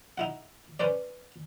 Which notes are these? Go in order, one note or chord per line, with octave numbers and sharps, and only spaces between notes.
D#4 E4 F#5
C#4 B4 C5 D5